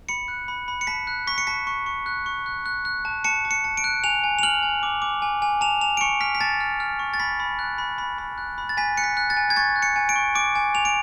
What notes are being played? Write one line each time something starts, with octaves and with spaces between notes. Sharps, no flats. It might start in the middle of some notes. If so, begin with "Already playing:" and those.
B5 C#7
F#6
B5
B5
C#7
A5 B6
F#6
C#6 B6
C#7
A5 B6
C#6
C#6
F#6
C#6
F#6
F#6
F#6
A5
A5 C#7
A5
C#7
A5
D7
F#6
G#5 F7
G#5
F7
F6 F#7
G#5
D6
D6
G#5
G#5
A5 F7
A5 F7
D7
C#6 C#7
F6 B6
B6
A5 A6
F6
F6
C#6
A6
B5 B6
B5
F#6
B5
B5
B5
F#6
B5
A6
G#5 B6
F#6 C#7
B6
F#6
A6
G#5
G#6
C#6 A6
F#6
C#7
G#5
D7
C#6
D6 D7
G#5
G#5 F7
D7